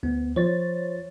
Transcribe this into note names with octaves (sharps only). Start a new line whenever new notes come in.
D2 B3
F3 C5 C#5 A6